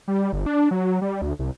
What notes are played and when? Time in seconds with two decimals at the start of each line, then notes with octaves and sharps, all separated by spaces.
0.08 G3
0.33 G1
0.46 D4
0.71 F#3
1.01 G3
1.22 D2
1.39 C2